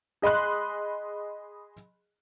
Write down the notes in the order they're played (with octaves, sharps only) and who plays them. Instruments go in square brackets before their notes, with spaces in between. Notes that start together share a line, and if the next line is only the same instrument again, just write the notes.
[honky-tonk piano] G#4 D#5 B5 C6 F#6